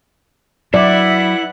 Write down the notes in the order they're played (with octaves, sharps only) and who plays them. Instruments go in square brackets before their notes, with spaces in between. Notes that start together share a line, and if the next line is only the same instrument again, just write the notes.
[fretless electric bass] F#3 [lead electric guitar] E4 [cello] B4 F#5 [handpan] D5